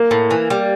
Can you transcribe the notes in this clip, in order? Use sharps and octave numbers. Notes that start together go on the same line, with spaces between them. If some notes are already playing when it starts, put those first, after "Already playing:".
Already playing: A#3
A2
E3
G3